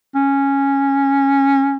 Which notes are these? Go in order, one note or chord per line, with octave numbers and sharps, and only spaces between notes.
C#4